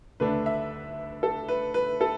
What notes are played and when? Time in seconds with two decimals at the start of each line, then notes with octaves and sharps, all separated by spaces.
0.20 D2 D3 A3 D4 B4
0.46 E5
1.23 A4
1.48 B4
1.74 B4
2.01 A4